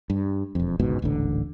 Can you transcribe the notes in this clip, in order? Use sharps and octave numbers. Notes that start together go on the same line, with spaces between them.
G2
E1 F2
G1 C#2 G#2 B2
D#1 A1 D3